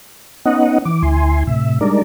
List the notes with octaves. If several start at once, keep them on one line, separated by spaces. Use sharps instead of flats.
B3 C#4 D#4 D#5 F#5
E3 D6
D2 E4 G#5 C6
A2 C3 E5
G3 G#3 D4 D#4 A#4 D5